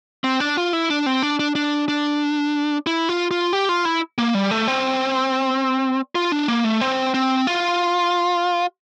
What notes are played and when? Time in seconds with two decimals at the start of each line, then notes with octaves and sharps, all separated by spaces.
0.24 C4
0.40 D4
0.57 F4
0.73 E4
0.90 D4
1.06 C4
1.23 D4
1.39 D4
1.55 D4
1.88 D4
2.87 E4
3.09 F4
3.31 F4
3.53 G4
3.69 F4
3.85 E4
4.18 A#3
4.35 G3
4.51 A3
4.68 C4
6.15 F4
6.32 D4
6.48 A#3
6.65 A3
6.81 C4
7.14 C4
7.47 F4